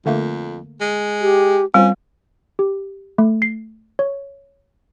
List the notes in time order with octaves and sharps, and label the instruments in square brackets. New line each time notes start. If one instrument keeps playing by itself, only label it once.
[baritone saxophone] F2 [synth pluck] D3 A3 A#3
[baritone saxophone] G#3
[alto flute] G4
[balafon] G3 [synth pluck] C4 F4 C5 [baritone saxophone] C#4
[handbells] G4
A3
C7
C#5